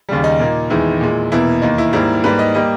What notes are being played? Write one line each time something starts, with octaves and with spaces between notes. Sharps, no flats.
D#2 C#3 G3
D#4
A#2 A#3
E2 D#3 G#3 E4
A#2 G#3
E2 B2 A#3 E4
D#2 D#3 A#3 D#4
E4
G#2 G3 A#3 E4
G#2 G3 A#3 B4
D#5
G3 A#3 D#5